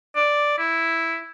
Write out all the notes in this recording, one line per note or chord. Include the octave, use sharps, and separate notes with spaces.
D5
E4